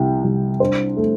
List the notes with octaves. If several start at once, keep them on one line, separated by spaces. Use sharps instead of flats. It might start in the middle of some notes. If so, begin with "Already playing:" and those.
Already playing: C2 C3 G5
C2
D4 C5
A3